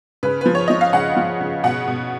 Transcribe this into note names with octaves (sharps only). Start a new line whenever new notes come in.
C#3 B4
F3 B4
C#5
F3 D#5
F5
C#3 F#5
F3
C#3
B2 F#5
B2